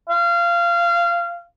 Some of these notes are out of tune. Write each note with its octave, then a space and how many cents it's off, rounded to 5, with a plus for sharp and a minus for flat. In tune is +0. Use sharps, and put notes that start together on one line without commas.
F5 -20